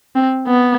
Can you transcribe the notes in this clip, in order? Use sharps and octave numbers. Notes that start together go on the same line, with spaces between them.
C4
B3